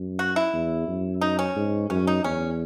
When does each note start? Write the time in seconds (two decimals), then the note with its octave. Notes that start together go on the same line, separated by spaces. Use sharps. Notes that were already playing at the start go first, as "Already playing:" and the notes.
Already playing: F#2
0.19 F#4
0.36 E4
0.53 E2
0.88 F#2
1.21 D#4
1.39 C#4
1.56 G#2
1.90 F#2 C#4
2.07 D#4
2.24 E2 C#4